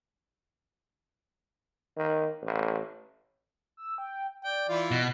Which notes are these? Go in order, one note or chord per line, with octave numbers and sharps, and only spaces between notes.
D#3
A1
E6
G5
D5 G5
E3 E4 F4
B2 D7